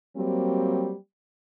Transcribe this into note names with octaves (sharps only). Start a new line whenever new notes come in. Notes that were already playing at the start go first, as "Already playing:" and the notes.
F#3 G3 A#3 C4